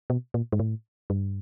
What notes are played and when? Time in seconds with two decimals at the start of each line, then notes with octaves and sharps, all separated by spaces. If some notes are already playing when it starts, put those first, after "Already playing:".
0.10 B2
0.34 A#2
0.52 G#2
0.60 A2
1.10 G2